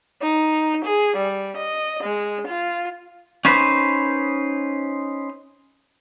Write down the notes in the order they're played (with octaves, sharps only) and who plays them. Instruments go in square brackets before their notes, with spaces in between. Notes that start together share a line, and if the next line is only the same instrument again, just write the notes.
[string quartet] D#4
G#4
G3
D#5
G#3
F4
[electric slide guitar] C#4 D#4 B4 C5